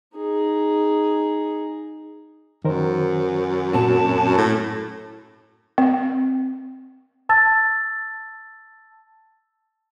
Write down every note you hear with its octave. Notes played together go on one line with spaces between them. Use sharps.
D#4 G#4
F#2 D#3 A#4 C5
A#2 C4 F#4 A5
A2
C4
A5 E6 A6